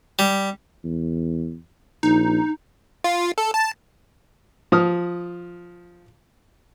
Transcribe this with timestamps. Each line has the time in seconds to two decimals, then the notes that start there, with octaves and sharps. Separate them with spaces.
0.19 G3
0.84 E2
2.03 A#1 D#4
3.04 F4
3.38 A4
3.54 A5
4.72 F3 D#6 F6